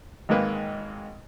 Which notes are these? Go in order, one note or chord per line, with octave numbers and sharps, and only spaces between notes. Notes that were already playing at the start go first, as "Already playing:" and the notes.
G#1 G#2 G#3 A#3 B4